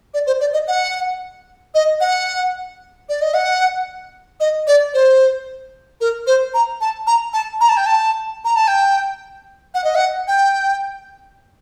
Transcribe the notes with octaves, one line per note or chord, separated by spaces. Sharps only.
D5
C5
D5
D#5
F#5
D#5
F#5
D5
D#5
F#5
D#5
D5
C5
A#4
C5
A#5
A5
A#5
A5
A#5
A5
G5
A5
A#5
A5
G5
F#5
D#5
F#5
G5